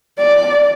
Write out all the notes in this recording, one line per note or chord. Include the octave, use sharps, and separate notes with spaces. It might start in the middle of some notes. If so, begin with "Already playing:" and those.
D5